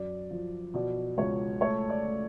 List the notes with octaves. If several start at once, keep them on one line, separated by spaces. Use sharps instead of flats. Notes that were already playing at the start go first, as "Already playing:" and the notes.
Already playing: F#2 D5
F3
B2 D5
C#2 C#5
A3 C#5
D5
A3